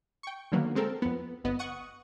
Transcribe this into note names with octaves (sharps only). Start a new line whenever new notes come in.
G5 C#6
D3 D#3 F#3 A#3 B3
G#3 C4 A4 A#4
F2 B3
G1 B3 D#5
F#5 C#6 D#6